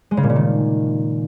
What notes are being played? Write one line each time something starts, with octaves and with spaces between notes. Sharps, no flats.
G#3
C#3
A#2
C#3
D#3